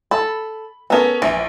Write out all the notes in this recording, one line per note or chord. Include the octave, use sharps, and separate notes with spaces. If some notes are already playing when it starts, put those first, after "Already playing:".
A4 B5
B3 C#4 A4 A#4
A#1 E3